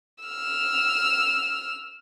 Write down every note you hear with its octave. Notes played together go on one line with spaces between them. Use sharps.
E6 F6